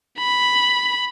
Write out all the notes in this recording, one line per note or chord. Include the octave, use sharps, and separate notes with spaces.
B5